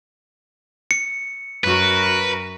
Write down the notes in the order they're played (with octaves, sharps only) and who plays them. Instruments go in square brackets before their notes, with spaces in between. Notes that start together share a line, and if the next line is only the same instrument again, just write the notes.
[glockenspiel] C#7
[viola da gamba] F#2 F#4 A#4 [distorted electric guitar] B4